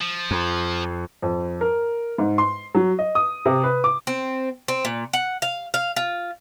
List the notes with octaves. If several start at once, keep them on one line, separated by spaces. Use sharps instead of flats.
F3
F2
F2
A#4
G#2
C6
F#3
D#5
D#6
C3
B4
D6
C4
C4
A#2
F#5
F5
F5
F4